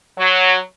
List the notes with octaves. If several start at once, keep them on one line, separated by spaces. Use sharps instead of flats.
F#3